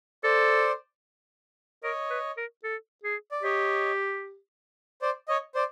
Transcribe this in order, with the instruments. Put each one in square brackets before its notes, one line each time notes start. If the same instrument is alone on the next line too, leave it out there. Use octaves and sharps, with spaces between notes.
[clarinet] A4 [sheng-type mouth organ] C5 D5
[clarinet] A#4 [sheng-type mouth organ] C#5 D#5
[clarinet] B4
A#4
A4
G#4
[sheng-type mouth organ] D5
[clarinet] G4 [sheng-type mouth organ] C#5 D#5
[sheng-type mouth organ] C5 D5
C#5 D#5
C5 D5